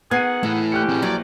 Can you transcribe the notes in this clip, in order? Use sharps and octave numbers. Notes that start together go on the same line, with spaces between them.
D#3 B3 G#4 F#5 G#6 C7 D#7
E3 A3 E4
D3 C#4 G4 F#6 C#7
C4 G#4
A#1 F#3 D5